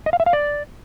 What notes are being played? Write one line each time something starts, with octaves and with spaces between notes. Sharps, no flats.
D#5
F5
E5
F5
D5